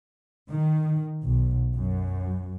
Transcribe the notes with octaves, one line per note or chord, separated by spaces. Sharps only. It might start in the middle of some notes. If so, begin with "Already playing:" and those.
D#3
B1
F#2